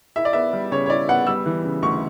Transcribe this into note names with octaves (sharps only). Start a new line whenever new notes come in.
E4 E5
D5
B3 E5
G3
C#3 C#5
C#5
E4 D5
B3 F#5
G3 E6
E3
C#3
D2 C#6